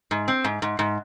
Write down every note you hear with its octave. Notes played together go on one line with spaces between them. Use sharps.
G#2
C4
G#2
G#2
G#2